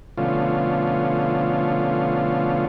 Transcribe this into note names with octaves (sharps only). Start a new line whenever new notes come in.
B2 D3 F3 A3 C#4 F4